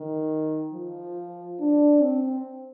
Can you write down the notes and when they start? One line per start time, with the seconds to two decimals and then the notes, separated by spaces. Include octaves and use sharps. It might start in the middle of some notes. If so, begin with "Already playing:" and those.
Already playing: D#3
0.73 F3
1.60 D4
2.02 C4